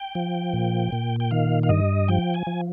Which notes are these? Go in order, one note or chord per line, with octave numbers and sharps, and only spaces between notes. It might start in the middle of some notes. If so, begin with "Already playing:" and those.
Already playing: G5
F3
A#2
A#2
G5
D#3 F5
F5
G2 D#5
F3 G5
G#5
F3